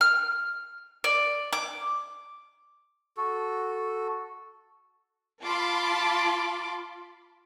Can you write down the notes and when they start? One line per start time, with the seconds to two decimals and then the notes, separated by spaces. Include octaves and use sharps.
0.01 F6
1.04 D5
1.53 D6
3.17 F#4 A4
5.43 F4 A5 B5 C6 D6